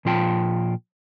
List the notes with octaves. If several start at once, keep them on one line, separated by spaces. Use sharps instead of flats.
A#2 F3 F4 G5 A5